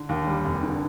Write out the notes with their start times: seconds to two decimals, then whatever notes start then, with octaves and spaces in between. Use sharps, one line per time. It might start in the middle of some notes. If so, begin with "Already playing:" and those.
Already playing: D3
0.09 D#2
0.27 G3
0.45 F1
0.63 D3